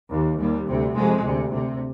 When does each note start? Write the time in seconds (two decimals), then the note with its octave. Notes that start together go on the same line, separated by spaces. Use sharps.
0.10 D#2
0.38 D#2 G3
0.67 D2 C3
0.95 F2 C3 G#3
1.23 D2 C3
1.52 D2 C3